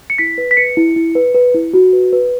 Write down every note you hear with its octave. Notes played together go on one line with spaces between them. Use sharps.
C#7
E4 B6
B4
B6
B4 C#7
E4
E4
B4
B4
E4
F#4
B4
B4